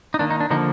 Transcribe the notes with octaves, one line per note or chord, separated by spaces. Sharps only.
D#4
D#3 A#3 D4
D#4
D4
D3 F3 A#3 D#4